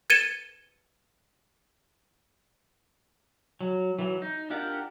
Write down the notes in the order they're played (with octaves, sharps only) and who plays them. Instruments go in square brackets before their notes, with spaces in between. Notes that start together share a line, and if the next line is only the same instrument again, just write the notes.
[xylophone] G#6 A6 C#7 D#7 E7 G7
[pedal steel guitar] F#3
E3 F#3
D#4
D4 F4 G4 A#4 F#5